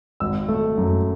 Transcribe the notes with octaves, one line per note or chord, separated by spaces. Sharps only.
G#1 E6
A3
F#2